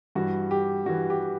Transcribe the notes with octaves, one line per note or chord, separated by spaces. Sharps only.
G2 E3 F#4
G4
G2 E3 F#4
G4